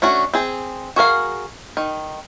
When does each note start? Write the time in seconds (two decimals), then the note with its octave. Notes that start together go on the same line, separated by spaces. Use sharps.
0.02 A3 C#4 D4 F#4
0.34 C4 G#4
0.96 F#4 G#4 A#4 F5
1.77 D#3